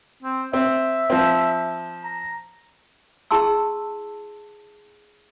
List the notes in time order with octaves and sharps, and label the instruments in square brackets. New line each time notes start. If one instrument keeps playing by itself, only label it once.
[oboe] C4
[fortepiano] C4 [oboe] E5
[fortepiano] F3 C4
[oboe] A#5
[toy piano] E4 G#4 A5 C6 E6